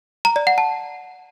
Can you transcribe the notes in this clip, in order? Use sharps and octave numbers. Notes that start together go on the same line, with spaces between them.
A#5
D5
F#5
A5